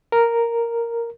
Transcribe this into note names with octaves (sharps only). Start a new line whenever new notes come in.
A#4